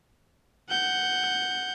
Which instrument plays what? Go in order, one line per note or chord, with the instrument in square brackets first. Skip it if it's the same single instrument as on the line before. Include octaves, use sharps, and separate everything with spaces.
[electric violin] F#5 G6